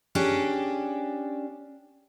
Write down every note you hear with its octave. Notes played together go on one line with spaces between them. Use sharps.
C#4 D4 G4 G#4